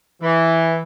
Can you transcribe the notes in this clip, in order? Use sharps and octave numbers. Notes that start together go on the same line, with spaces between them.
E3